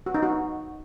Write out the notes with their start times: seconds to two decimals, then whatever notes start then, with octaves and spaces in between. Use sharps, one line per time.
0.06 F#4
0.14 D#4
0.23 F#4